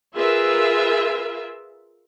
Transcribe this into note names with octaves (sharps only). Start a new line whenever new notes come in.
F4 G#4 A#4 B4 E5